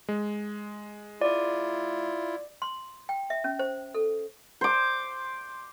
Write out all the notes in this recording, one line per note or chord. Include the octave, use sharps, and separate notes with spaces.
G#3
E4 F4 D5
C6
G5
E5
C#4
C5
A4
C5 D6